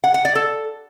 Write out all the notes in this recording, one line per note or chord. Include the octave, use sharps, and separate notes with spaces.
F#5
F#5
D5
A4